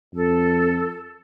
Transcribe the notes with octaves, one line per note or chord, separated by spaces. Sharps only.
F2 A4